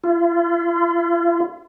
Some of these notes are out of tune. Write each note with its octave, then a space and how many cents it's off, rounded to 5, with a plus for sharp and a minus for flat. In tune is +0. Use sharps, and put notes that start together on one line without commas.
F4 -45